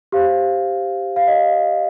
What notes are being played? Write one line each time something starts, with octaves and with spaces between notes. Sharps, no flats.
G4 C5 F5
F5
D#5